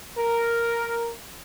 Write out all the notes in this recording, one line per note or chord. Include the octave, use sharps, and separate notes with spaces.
A#4